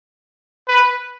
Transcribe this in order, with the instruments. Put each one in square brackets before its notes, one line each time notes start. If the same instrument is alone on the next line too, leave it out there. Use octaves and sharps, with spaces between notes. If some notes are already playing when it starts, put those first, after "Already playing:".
[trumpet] B4